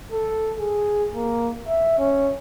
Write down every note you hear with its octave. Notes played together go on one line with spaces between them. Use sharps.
A4
G#4
A#3
E5
C#4